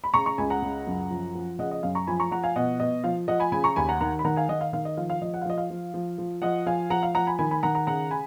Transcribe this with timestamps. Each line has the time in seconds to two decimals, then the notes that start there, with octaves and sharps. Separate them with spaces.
0.04 B5
0.14 C#3 A#5 C#6
0.26 A#5 C#6
0.38 C#2 G#5 B5
0.50 F#5 A#5
0.62 C#3
0.87 F#2
1.11 F3
1.35 F3
1.59 C#3 D#5 F#5
1.71 D#5
1.83 F#2 F5
1.95 A#5 C#6
2.07 F3 G#5 B5
2.20 A#5 C#6
2.31 F3 F#5 A#5
2.43 F5 G#5
2.56 B2 D#5 F#5
2.80 B2 D#5
3.04 F3 F5
3.28 F3 D#5 F#5
3.40 G#5 B5
3.52 C#3 G#5 B5
3.64 A#5 C#6
3.76 D#2 G#5 B5
3.89 F#5 A#5
4.01 D#3 F#5 A#5
4.19 B5
4.25 D#3 F#5 A#5
4.36 F5 G#5
4.49 D#3 D#5 F#5
4.61 F5
4.73 D#3 F5
4.85 D#5
4.97 F3 F5
5.10 F5
5.21 F3 D#5
5.34 F#5
5.42 F5
5.45 F3 D#5
5.58 F5
5.70 F3
5.94 F3
6.18 F3
6.42 F3 D#5 F#5
6.66 F3 F5 G#5
6.90 F3 F#5 A#5
7.03 F5
7.15 F3 F#5 A#5
7.27 G#5 B5
7.39 D#3 G#5 B5
7.51 G#5 B5
7.63 D#3 F#5 A#5
7.75 F#5 A#5
7.87 C#3 F#5 A#5
8.11 G#5 B5